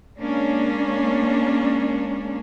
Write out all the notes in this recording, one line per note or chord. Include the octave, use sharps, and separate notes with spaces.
G#3 A#3 C#4 D4